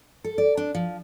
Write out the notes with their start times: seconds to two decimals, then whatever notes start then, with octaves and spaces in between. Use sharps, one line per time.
0.24 A4
0.38 D5
0.57 D4
0.75 F3